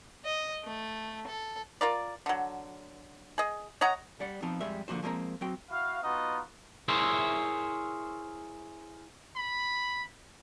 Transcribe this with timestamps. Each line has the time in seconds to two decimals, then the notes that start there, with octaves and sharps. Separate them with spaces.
0.25 D#5
0.64 A3
1.27 A4
1.81 F4 A#4 D5
2.26 D3 F#3
3.38 G#4 D#5
3.81 C#5 D#5 F#5 A#5
4.20 G3 D5 F#5
4.42 F3 B3 C4 D#4
4.60 F2 G3 G#3 E5
4.88 D3 F3 A#3 F#4 C5
5.03 F3 G#3 A#3 C4 A#4 A#5
5.41 F#3 C4 G5
5.71 E4 F#4 F5
6.04 B3 D#4 F4 F#4 D#5
6.88 E4 G#4 A#4 C5 C#5 E5
9.36 B5